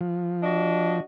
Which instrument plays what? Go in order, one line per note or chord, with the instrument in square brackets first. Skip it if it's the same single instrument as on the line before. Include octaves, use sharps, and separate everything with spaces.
[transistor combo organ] F3
[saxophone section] D4 F#4 D#5